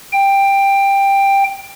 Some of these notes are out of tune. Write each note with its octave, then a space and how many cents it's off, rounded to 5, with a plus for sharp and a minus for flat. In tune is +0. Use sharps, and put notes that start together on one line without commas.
G5 +10